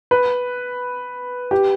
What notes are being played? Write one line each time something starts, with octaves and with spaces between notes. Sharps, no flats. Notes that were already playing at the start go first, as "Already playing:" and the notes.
B4
G4